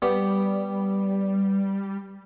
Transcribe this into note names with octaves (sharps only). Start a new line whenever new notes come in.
G3 B3 G4 B5